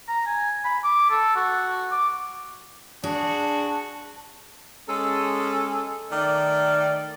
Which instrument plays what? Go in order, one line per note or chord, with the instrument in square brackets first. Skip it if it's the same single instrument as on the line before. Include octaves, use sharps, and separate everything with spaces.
[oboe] A#5
G#5
B5
D6
A4
F#4
D6
[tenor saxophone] D4 [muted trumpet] F#4 [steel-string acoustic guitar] G#4 [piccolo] A5
[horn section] G#3 C#4 A4
D#3 A3 D5